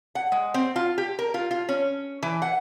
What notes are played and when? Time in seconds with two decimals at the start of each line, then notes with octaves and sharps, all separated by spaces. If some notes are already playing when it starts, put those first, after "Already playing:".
0.15 F#5
0.32 G#3
0.54 C4
0.76 F4
0.98 G4
1.19 A#4
1.34 F4
1.51 F4
1.69 C#4
2.23 E3
2.42 F#5